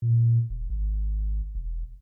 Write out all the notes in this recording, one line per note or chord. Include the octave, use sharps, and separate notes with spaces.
A#2
E1
G#1
E1